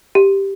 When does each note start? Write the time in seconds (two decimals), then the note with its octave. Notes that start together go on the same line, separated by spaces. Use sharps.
0.15 G4